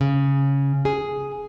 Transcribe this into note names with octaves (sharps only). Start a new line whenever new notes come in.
C#3
G#4